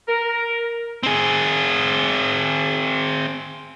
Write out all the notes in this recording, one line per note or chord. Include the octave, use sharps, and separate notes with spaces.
A#4
C4 G#4